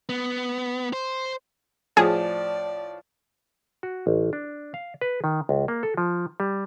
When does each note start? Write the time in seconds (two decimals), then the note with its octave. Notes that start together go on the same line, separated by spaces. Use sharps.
0.09 B3
0.93 C5
1.97 A2 F3 G#4 D5
3.83 F#4
4.07 A1
4.33 D4
4.74 F5
5.01 B4
5.24 D#3
5.49 C#2
5.68 A#3
5.83 A4
5.97 F3
6.40 G3